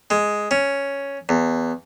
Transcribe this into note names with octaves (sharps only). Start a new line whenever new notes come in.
G#3
C#4
E2